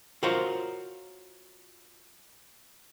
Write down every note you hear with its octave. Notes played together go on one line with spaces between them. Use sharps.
F4 F#4 A#4 C5 C#5 F5